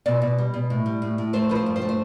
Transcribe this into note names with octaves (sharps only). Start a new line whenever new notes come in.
B2 D5
B2
G3
B2
A2
G3
A2
A2
A3 C5
F3 B4
C5
G2
C5
A3
C5